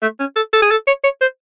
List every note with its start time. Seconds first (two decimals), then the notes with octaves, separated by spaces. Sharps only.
0.02 A3
0.20 C#4
0.36 A4
0.53 A4
0.62 G#4
0.71 A4
0.87 C#5
1.04 C#5
1.21 C5